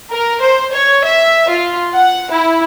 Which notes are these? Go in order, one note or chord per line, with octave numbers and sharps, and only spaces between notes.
A#4
C5
C#5
E5
F4
F#5
E4